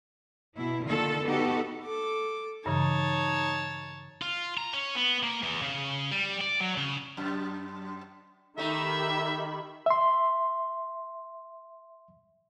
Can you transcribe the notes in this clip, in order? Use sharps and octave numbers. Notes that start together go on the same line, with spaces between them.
B2 E4
D3 D#3 A#3 F4 A4
B3 D#4 F#4 G4 A4
A4 D6
G2 C#3 E3 D#4 C#5 A5
F4
A#5
C#4
B3
A#3
E2
C#3
G3
D5
F#3
C#3
F#2
D#3 A3 D#4 G4 E5 B5
E5 C6